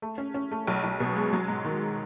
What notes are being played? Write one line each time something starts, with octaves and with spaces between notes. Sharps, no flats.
A3
C#4
C#4
A3
B1
B1
B2
G#3
F#3
G#2
D#3